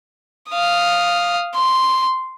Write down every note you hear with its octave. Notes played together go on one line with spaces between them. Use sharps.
F5 D#6
C6